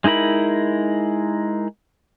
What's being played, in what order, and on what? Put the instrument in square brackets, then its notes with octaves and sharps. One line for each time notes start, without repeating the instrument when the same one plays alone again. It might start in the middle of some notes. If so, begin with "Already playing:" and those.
[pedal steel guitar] G#3 D#4 E4 A#4 B5